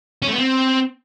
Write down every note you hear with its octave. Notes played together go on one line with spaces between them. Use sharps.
C#4
A3
B3
C4